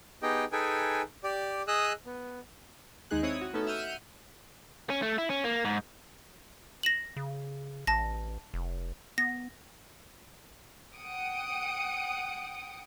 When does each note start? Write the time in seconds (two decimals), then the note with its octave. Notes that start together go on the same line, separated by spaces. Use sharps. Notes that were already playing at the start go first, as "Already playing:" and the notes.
0.23 B3 D#4 G4 G#4 D#5 G5
0.52 D#4 G#4 A4 B4 G5 G#5
1.24 G4 D5
1.68 G#4 D#5 D#6 E6 F#6
2.06 B3
3.11 D#2 G#3 D#4 G#4 F#6
3.23 C4 E4 C#5 D#6
3.41 F#4
3.53 A3 B3 C#4 D#4 F#4 A4
3.66 E5 F#5 E6 F6 G6 D#7
4.90 C#4
5.02 A3
5.18 E4
5.30 C#4
5.44 A#3
5.65 G#2
6.83 A#6 E7 F#7
7.17 C#3
7.87 A1 A5 A#6
8.54 F1
9.18 B3 A#6
10.97 F#5 G5 D#6 C#7 D7